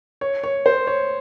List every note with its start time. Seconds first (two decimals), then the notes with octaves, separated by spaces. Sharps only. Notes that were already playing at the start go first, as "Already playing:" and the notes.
0.21 C#5
0.43 C#5
0.66 C5
0.87 C#5